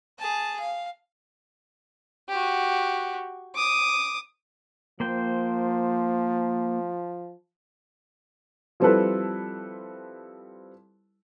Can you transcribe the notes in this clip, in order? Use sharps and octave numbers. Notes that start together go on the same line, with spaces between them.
G#4 A5
F5
F#4 G4
D6 D#6
F3 A#3 C5 G5
F3 G3 C4 E4 A4 B4